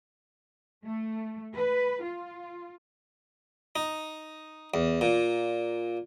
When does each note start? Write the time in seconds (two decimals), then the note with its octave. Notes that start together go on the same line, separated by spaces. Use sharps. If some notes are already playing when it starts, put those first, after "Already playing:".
0.86 A3
1.54 B4
2.02 F4
3.76 D#4
4.74 E2
5.01 A#2